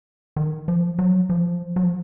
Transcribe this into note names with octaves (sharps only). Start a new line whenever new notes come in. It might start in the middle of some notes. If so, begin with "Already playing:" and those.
D#3
F3
F#3
F3
F#3
F3